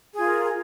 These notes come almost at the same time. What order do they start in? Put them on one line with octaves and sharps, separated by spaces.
G#4 F4 A#4